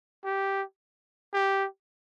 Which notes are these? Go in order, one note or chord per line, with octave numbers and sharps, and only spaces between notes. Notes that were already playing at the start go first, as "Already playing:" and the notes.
G4
G4